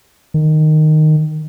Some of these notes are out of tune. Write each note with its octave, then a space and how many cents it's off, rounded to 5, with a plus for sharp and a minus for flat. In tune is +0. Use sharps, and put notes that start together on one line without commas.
D#3 -10